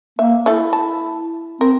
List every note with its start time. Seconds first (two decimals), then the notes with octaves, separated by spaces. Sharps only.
0.19 A#3 E5
0.46 A3 E4 A4 E5
0.73 A5
1.61 C4 A#4